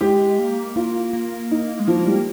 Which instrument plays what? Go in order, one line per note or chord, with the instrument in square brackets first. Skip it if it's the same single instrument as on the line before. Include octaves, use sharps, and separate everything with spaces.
[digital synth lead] G#3 [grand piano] G4
[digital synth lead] A#3
[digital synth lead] A#3 [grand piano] F4
[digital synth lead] A#3
[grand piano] D#4
[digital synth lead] G#3
[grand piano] F3 [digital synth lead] A#3
[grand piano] G3